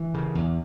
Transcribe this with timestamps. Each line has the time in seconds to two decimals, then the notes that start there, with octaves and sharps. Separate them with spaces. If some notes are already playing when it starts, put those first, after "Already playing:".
Already playing: E3
0.14 C#3
0.35 E2